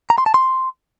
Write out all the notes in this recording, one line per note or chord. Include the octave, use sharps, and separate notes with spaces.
A#5
C6
A5
C6